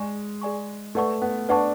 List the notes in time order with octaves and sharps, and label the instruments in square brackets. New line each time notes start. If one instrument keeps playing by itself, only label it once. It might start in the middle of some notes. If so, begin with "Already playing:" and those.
Already playing: [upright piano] G#3 [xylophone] G#4 D5 G#5 C#6
[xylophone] G#4 D5 G#5 C#6
[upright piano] A3 [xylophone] B4 D5 F#5 A5 C#6
[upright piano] B3
[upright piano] D4 [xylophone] B4 D5 F#5 A5 C#6